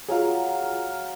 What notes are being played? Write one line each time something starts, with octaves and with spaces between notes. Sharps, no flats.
F#3 F4 G#4 A#4 F5